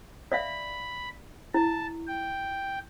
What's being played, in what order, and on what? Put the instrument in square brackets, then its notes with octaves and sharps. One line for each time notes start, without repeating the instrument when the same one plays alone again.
[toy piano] D5 E5 F5 [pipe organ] B5
[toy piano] E4 [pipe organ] A5
[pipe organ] G5